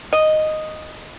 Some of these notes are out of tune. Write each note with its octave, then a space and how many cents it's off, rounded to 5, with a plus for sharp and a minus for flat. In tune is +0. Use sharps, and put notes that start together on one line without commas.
D#5 -5